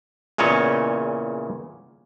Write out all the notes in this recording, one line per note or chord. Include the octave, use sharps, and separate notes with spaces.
E2 A#2 C#3 C#5 D#5